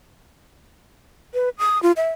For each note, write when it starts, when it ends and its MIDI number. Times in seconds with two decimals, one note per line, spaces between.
1.34 1.49 71
1.58 1.81 87
1.83 1.92 65
1.97 2.10 76